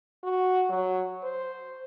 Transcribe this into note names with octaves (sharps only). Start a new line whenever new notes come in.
F#4
F#3
C5